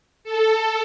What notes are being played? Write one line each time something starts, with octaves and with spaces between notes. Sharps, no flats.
A4